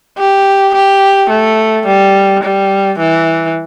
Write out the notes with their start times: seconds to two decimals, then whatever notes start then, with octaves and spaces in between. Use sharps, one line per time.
0.18 G4
0.75 G4
1.30 A3
1.87 G3
2.43 G3
2.99 E3